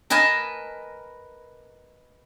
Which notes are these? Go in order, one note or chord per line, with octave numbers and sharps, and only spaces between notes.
A#4 B4 D#5 G#5 A5